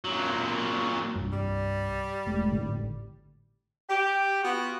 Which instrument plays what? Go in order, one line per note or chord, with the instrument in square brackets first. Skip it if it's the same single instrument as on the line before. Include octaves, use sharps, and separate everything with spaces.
[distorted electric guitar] A#2 F#3
[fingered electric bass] C2 G2
[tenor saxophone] G3
[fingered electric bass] E1 G#3 A3
G#1 A2 D3
[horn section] G4
B3 F4 F#4